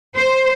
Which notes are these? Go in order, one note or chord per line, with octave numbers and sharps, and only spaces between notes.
C5